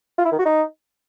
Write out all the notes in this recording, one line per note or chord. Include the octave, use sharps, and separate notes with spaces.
F4
E4
D#3
F#4
D#4